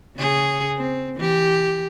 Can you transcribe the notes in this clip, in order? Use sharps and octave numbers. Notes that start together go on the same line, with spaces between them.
C#3 G#4 C#5
C4
E3 G4